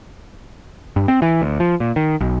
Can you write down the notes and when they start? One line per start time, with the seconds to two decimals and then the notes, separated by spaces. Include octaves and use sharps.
0.96 G2
1.08 C4
1.22 E3
1.42 D2
1.60 F3
1.80 A#2
1.96 D#3
2.21 B1